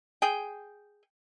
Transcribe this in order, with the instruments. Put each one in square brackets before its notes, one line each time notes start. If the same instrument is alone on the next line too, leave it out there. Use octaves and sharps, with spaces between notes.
[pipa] G#4 G5